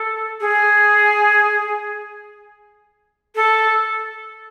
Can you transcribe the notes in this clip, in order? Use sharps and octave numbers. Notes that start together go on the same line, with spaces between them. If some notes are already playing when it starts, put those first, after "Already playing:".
Already playing: A4
G#4
A4